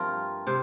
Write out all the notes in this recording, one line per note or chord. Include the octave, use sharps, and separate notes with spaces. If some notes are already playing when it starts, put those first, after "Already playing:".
Already playing: G2 F3 A3 C4 F4 A#4
C3 C5